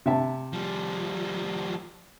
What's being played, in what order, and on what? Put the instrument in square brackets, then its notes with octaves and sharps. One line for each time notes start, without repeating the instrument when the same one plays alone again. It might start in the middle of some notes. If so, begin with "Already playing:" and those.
[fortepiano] C3 E5 A5
[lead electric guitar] F3 G3